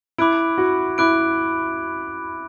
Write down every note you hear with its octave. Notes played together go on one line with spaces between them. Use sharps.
E4 B5 D6 F#6 D7
F#4
E4 B5 D6 F#6 D7